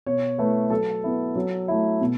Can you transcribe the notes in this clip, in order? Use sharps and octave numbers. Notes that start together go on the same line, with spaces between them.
B2 C#5
A3 E4 B4
F#3 A4
B3 E4
F#3
A3 E4
B2